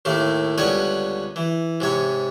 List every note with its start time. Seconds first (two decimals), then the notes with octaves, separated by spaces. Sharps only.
0.05 D#2 A2 A3 A#3
0.58 C#2 D3 G3 B3 C#5 D#5
1.36 E3
1.80 G#2 C3 C#5